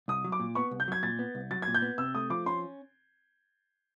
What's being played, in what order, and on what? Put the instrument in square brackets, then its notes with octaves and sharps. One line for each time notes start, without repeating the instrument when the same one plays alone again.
[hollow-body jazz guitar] C2 [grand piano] D#6
[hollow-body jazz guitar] F#3
[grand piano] D6
[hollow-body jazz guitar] A#2
[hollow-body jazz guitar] B3 [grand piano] C#6
[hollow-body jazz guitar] C2
[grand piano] G6
[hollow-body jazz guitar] F#3 [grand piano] G#6
[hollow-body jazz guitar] A#2 [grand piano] A6
[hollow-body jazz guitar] B3
C2
[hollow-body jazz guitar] F#3 [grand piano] A6
[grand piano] G#6
[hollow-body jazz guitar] A#2
[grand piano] G6
[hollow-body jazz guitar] B3
[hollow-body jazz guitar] C3 [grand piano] E6
[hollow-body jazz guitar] A3 [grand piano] D#6
[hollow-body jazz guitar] F3 [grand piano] D6
[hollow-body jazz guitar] C#4 [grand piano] C6